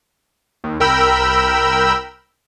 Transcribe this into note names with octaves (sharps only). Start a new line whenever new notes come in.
D#2
C2 A#4 G5 B5 E6